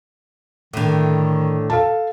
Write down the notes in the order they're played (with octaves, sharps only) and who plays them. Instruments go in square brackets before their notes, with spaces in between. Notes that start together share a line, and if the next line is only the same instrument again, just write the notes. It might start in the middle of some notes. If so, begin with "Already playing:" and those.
[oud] A2 D3 [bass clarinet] D#3
[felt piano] A4 F5 A5